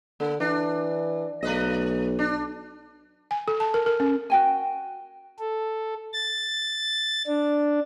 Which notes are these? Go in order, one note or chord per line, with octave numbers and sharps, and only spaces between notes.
D3 A#3
E3 D4
B1 A3 B4 D#5
D4
G#5
A4
A5
A#4
A#4
C#4
F#4 G5 G#5
A4
A6
D4